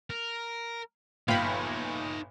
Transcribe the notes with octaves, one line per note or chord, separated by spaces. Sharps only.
A#4
G1 A#2 D#4 C#5 F5 G5 B5